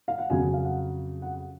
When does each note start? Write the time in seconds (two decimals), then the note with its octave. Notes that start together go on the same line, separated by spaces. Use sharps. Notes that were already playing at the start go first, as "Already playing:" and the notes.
0.08 F5
0.18 F#5
0.30 F2 C#3 F#3 G#5
0.54 F5
0.64 F#5
1.22 F#5